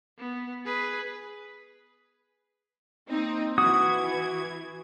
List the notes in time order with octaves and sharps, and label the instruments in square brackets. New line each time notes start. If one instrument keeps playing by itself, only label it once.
[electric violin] B3
G#4 B4
[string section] A#3 C4 D#4
[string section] E3 G#6 [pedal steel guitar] F#4 D#6